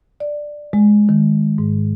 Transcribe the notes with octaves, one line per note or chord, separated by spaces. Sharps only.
D5
G#3
D#3
G#2